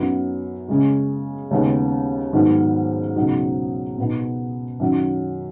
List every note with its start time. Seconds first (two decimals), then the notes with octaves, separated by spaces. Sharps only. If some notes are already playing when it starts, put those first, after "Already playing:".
Already playing: F#2 F#3 B3 D#4
0.68 C#3 G#3 C#4
1.51 D#2 C#3 G#3 B3 D#4
2.33 G#2 D#3 F#3 B3 D#4
3.16 C#2 B2 F#3 D#4
3.98 B2 B3 D#4
4.80 F#2 D#3 F#3